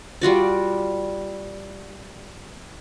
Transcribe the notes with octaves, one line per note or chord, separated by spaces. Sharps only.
G3 F4 F#4 D5